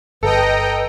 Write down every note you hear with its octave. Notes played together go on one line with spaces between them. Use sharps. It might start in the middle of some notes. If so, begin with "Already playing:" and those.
G1 A4 B4 D#5 G5 A#5